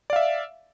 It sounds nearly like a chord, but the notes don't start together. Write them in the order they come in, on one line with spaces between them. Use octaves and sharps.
D5 F5 E5